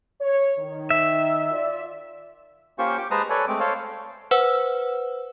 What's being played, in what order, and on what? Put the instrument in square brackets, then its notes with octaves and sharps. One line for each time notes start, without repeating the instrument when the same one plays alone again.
[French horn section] C#5
D#3
[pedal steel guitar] E5
[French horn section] F4 D5
[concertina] A#3 C#4 F4 G4 C5 C#6
G4 D6
G#3 B4 C5 A5 A#5 D#6
A4 B4 C#5 D5 G#5
G#3 A3 C4 D6
A4 C5 C#5 F5
[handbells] B4 C5 F#5 E6